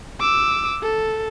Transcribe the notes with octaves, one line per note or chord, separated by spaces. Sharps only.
D6 E6
A4